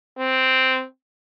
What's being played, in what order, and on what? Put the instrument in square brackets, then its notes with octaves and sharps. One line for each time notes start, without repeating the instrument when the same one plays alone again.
[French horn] C4